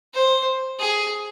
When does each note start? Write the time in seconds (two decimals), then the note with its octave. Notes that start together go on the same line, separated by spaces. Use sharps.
0.14 C5
0.79 G#4